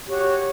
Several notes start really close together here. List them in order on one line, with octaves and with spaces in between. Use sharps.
G4 F#4 C#5